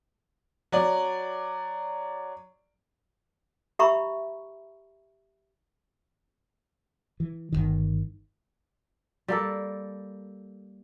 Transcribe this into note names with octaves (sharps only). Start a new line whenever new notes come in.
F#3 D5
G4 E5 A#5 B5 C#6
E3
G1 C2 D#3
G3 A#3 A4